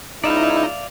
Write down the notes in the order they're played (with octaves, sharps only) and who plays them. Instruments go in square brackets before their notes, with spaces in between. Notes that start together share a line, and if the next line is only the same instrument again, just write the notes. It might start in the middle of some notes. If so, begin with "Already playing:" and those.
[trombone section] C#2 E4 [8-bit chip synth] D#4 [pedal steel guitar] D5 E5 F5